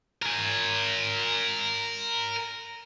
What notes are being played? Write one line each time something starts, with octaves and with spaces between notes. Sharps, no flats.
A#4 G#5